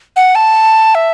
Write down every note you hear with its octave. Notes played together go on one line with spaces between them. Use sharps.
F#5
A5
E5